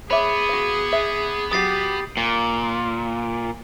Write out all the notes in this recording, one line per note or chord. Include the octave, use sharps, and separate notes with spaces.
B3 G#4 C#5 E5 B5 D6
F#4 F5
E5
F#3 F#4 G4 D#6 A6 C7
A#2